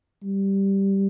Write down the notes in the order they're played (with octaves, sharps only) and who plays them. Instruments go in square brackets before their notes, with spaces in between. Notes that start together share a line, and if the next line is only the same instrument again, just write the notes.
[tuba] G3